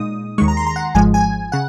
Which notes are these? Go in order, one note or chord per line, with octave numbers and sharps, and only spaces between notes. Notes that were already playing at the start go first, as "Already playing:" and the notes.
Already playing: A#2 G#3 D#4 D#6
D#2 D#3 G#3 C#6
A#5
C6
A#5
F#5
G#1 G#2 F3 G#3 G#5
G#5
C#3 F#5